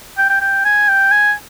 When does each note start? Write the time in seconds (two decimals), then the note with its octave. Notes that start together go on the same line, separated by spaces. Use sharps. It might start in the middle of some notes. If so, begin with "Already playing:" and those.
0.18 G5
0.30 G5
0.41 G5
0.65 G#5
0.89 G5
1.12 G#5